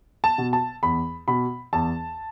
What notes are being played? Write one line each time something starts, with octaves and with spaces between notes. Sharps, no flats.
A5
B2
A5
E2 B5
B2 B5
E2 A5